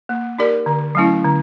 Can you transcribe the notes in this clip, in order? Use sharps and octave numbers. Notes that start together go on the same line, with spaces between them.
A#3
D#4 G4 A#4 D5
D3
F#3 A3 C#4 E4
D3